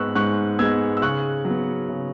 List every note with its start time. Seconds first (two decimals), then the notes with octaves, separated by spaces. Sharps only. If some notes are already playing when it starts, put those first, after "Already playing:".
Already playing: G#2 G#3 B3 C#6 E6 F#6
0.15 G#2 C#6 F#6
0.59 G#3 B3 E6 G#6
0.97 E6
1.02 C#3 C#6 F#6
1.45 F#3 B3
1.89 C#3